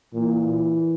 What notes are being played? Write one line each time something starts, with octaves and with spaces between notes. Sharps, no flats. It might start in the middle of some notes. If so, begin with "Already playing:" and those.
A#2 E3